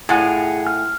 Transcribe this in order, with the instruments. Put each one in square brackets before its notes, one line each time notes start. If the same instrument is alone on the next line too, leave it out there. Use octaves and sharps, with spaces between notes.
[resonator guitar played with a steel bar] A2 F4 [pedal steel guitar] G#4 F#5 G#5
[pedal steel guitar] F6